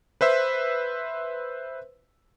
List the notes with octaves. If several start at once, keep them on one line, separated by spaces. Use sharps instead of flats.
B4 C5 E5